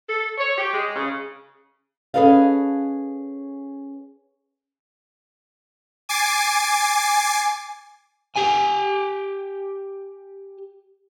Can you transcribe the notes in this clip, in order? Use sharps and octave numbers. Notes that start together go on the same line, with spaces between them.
A4
C#5
G4
G#3
C#3
C#4 G#4 A4 B4 D#5 F5
G#5 D6 A6 C7
G4 G#5